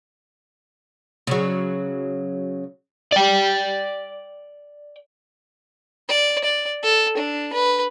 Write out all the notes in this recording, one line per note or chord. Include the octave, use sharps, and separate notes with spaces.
C#3 F#3
D5 G5
D5
D5
A4
D4
B4